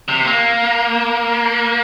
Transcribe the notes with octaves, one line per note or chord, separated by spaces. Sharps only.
C3
A#3